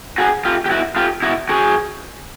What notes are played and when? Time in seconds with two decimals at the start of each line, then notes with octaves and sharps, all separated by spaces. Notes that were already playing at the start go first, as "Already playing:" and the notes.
0.18 F#4 G#4
0.45 F4 G4
0.66 G4
0.71 E4 F#4
0.96 F4 G4
1.22 E4 F#4
1.49 F#4 G#4